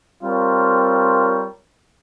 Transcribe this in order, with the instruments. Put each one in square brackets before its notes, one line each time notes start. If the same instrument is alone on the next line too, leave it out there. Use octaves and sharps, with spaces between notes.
[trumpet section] G3 C4 F4 A#4 C#5